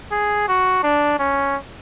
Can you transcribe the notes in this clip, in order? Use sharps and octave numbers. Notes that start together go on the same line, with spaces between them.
G#4
F#4
D4
C#4